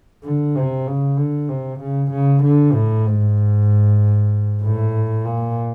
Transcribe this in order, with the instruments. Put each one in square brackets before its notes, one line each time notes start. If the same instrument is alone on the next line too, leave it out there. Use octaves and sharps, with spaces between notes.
[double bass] D3
C3
C#3
D3
C3
C#3
C#3
D3
A2
G#2
A2
A#2